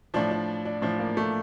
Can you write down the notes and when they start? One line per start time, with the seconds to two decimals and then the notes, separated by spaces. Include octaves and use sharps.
0.14 A2 F3 D4
0.31 D4
0.65 D4
0.82 A2 F3 D4
0.99 A#3
1.17 A3